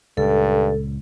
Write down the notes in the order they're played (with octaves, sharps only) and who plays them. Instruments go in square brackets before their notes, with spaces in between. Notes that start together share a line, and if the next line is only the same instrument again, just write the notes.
[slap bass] C#2 A#2 [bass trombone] G2 [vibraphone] A4